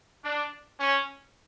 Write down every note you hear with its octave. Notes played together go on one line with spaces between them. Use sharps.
D4
C#4